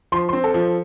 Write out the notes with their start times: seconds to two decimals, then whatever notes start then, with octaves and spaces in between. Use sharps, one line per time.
0.12 F3 C6
0.29 C4 C6
0.44 A4
0.54 F3